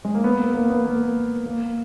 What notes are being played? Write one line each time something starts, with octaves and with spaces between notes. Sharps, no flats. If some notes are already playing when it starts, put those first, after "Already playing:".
G#3
A#3
B3
A#3
A#3
B3
A#3
A#3